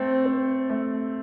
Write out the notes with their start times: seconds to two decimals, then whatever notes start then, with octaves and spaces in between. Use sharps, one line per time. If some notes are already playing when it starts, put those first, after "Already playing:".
Already playing: A3 C4
0.26 C4
0.70 A3